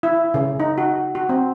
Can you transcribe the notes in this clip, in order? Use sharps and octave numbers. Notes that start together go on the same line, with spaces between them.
E4
C#3
D#4
F#4
F#4
C4